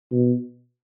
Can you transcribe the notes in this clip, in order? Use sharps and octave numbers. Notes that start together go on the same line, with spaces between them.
B2